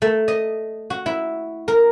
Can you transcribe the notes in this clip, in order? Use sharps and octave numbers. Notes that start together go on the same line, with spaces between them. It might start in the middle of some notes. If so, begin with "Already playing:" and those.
A3
D#5
F#4
E4
A#4